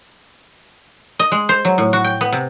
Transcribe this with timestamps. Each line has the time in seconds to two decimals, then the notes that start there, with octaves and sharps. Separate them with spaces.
1.19 D#5
1.32 G#3
1.49 C5
1.65 F#3
1.78 A2
1.93 F#4
2.04 G5
2.21 B3
2.32 C3